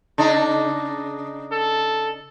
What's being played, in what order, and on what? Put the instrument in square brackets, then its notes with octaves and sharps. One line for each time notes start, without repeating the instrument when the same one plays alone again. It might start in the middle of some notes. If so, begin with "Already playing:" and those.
[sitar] C#3 D4 D#4
[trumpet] A4